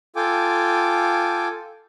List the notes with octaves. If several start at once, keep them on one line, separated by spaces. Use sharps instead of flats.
F4 A4 G5 G#5 D6